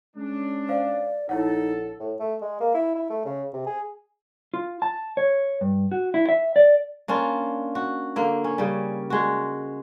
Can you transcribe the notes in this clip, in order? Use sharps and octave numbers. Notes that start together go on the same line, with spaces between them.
G#3 C#4 D4
C5 D5 F5
A#1 D#4 E4 A4 C#5 F#5
A2
A3
G#3
A#3
E4
E4
A3
C#3
C3
G#4
F4
A5
C#5
G2
F#4
E4
E5
D5
A#3 C#4 D4 F4
F#4
D3 A#3
C#4
C#3 G3
G#3 F#4